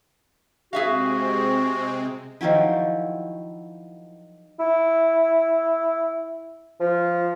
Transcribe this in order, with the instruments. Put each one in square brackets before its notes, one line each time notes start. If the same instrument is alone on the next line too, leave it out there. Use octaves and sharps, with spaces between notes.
[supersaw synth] C3 G#3 C4 [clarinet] F#4 [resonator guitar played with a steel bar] G#4 E5 F5
[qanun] D#3 F3 F#3 E4
[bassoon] E4
F3